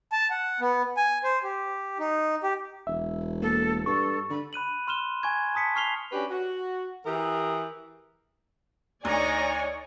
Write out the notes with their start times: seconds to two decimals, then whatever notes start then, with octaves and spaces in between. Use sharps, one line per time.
0.12 A5
0.30 F#5
0.60 B3
0.97 G#5
1.24 C5
1.43 G4
1.99 D#4
2.43 G4
2.87 E1 E5
3.42 A#3 A4
3.86 G2 A4 C#6
4.30 D3 B5
4.53 B5 F#6 D#7 F#7
4.87 C6 F6 E7 G7
5.23 G#5 C#6 G#6
5.55 A5 D#6 B6 C#7
5.76 C#6 F6 C7 F7 G7
6.12 C#4 D4 F#4 G4 B4
6.30 F#4
7.05 E3 G4 G#4 A#4
9.05 D2 D#4 C#5 D5 G#5 A#5